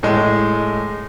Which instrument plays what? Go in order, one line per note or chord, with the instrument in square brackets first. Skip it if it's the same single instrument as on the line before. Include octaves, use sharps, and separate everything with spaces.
[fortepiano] A2 G#3